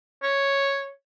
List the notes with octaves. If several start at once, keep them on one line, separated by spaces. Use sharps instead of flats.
C#5